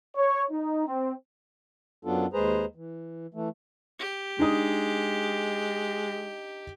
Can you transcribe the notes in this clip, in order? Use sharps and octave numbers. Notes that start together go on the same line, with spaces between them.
C#5
D#4
C4
F#2 F#3 B3 D4 F4 A4
D#2 G#3 G#4 B4 C5 A#5
E3
E3 A3
G4
G#3 D4 D#4 D#6